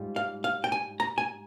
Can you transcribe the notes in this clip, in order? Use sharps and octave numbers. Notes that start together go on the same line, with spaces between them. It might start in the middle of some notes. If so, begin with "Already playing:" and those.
Already playing: G#2 G3 F4
F5
F5
G5
G#5
A#5
G#5